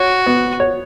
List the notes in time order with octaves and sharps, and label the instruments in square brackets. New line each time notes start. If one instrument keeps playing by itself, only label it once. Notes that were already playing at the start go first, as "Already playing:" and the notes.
Already playing: [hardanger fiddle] F#4 [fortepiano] C#5
[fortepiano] B3
C#5